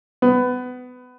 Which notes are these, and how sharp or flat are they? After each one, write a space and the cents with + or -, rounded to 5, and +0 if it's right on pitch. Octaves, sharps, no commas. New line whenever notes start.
B3 +20